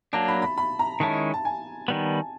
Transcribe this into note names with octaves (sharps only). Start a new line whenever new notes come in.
F#3 A#3 D4 A5
B5
B5
B5
A#5
D#3 G#3 C#4 E4 A5
A5
G#5
D#3 G3 B3